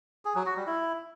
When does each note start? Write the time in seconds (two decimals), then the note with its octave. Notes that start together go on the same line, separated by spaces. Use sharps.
0.25 G#4
0.35 F#3
0.46 F#4
0.56 G3
0.67 E4